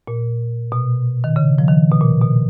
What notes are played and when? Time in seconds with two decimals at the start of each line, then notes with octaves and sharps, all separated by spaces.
0.08 A#2
0.72 B2
1.24 D#3
1.36 C#3
1.58 F3
1.68 D#3
1.91 B2
2.01 A#2
2.22 B2